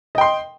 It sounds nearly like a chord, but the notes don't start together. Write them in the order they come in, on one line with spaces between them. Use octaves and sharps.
D#5 G5 C6